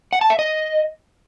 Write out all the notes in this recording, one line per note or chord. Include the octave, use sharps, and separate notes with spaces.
F#5
A5
E5
D#5